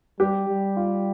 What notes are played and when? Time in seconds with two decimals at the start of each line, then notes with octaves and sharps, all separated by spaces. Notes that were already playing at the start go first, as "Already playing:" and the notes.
0.19 G3 G4
0.48 G3
0.76 F4